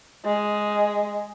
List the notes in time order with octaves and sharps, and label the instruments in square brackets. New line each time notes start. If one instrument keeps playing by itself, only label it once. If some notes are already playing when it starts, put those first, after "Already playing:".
[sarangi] G#3